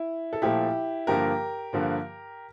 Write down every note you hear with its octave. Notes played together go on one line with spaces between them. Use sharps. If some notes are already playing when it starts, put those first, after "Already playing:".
Already playing: E4
A4
A#2 F3 A3 E4 G4
G2 D3 F3 A#3 G4 A#4
G2 D3 F3 A#3